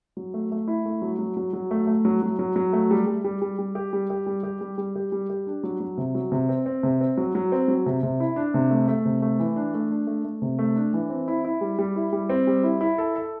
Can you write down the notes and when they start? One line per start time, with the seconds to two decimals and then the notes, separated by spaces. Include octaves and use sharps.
0.17 F#3
0.34 A3
0.52 A3
0.68 E4
0.85 A3
1.02 F#3
1.19 F#3
1.37 F#3
1.53 F#3
1.71 A3
1.87 A3
2.05 F#3
2.22 F#3
2.39 F#3
2.56 F#3
2.73 A3
2.91 G3
3.07 G3
3.24 G3
3.42 G3
3.59 G3
3.75 G4
3.93 G3
4.10 G4
4.27 G3
4.43 G4
4.61 G3
4.78 G3
4.95 G4
5.12 G3
5.30 G4
5.47 D4
5.63 F#3
5.80 F#3
5.98 C3
6.15 F#3
6.32 C3
6.49 C4
6.66 C4
6.83 C3
7.01 C4
7.17 F#3
7.35 F#3
7.52 C4
7.68 F#3
7.86 C3
8.03 C3
8.20 E4
8.36 D4
8.54 C3
8.71 A3
8.88 A3
9.05 C3
9.22 A3
9.39 E3
9.56 D4
9.74 A3
9.91 D4
10.07 A3
10.25 A3
10.42 C3
10.59 A3
10.76 D4
10.93 E3
11.10 C4
11.28 E4
11.45 E4
11.61 G3
11.79 G3
11.96 E4
12.13 G3
12.30 C4
12.47 G3
12.64 E4
12.81 E4
12.98 A4
13.16 A4